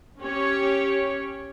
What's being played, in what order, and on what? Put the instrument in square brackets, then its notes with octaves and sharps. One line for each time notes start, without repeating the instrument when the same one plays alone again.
[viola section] C#4 G4 C#5